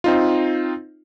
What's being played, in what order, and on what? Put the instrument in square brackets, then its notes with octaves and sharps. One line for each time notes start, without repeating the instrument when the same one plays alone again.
[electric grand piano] C4 D#4 F4